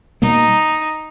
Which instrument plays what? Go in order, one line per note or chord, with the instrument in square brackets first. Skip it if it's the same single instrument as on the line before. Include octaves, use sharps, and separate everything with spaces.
[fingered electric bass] B2 G3 A#3 [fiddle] D#4